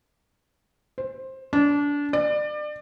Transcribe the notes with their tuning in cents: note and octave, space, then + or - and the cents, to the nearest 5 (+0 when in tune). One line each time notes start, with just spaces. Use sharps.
C5 +15
D4 -25
D5 +30